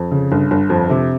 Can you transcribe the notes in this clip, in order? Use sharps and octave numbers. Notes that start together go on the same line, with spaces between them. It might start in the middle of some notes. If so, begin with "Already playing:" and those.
Already playing: F2
C#3
G1
G1
F2
C3